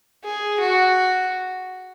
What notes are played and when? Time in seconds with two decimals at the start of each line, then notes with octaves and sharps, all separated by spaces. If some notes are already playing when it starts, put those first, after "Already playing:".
0.24 G#4
0.60 F#4